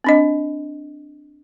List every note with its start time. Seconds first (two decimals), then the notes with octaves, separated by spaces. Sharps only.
0.04 C4 D4 D#5